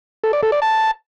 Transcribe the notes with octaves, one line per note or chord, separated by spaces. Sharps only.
A4
D5
A4
D5
A5